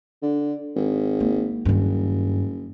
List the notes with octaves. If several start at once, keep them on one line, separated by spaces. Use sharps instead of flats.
D3
G#1
A#3 E4
F#1 G2 D#3